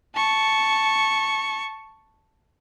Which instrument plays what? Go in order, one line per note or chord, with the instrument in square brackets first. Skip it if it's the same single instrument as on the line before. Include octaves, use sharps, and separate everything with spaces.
[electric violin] A5 C#6